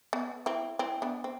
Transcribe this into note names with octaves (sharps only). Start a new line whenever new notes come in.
B3
C4 E4
C4 E4
B3 D4
C4